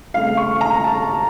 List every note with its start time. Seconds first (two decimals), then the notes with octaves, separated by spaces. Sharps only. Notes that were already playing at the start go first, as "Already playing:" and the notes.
0.14 C#3 A3 C4 F5
0.37 C#6
0.61 A#5
0.84 A5